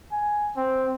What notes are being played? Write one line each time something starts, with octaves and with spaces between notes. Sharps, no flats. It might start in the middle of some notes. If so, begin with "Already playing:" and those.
G#5
C4